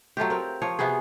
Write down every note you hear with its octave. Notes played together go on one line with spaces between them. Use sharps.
F#3 A3 F4 G4
C4 A#4
F3 C#5
C3 B3 F#4 G#4